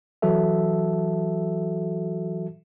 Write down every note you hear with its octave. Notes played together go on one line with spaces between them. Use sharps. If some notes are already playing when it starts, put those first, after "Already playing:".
E3 F#3 F#4 A4 E5